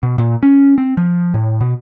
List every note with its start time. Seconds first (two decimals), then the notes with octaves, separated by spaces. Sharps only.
0.03 B2
0.18 A#2
0.43 C#4
0.78 C4
0.97 F3
1.34 A2
1.61 B2